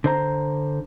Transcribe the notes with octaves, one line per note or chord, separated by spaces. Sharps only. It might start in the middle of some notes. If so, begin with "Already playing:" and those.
D3 C5 A#5